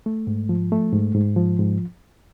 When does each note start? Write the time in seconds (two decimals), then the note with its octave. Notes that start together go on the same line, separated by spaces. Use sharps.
0.06 A3
0.27 G#2
0.49 F3
0.72 A3
0.93 G#2
1.15 G#2
1.36 F3
1.59 G#2